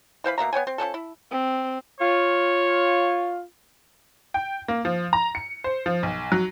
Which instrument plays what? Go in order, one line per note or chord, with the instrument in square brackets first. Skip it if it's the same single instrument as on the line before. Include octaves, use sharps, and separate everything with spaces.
[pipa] E3 C5 F5 B5
B2 A#3 E5 A#5
B3 C#5 G5 G#5
C4
F3 G3 C#4 A4
E4
[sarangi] C4
[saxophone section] F4 [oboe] C#5
[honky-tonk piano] G5
A#3
F3
A#5
C#7
C5
F3
B1
F#3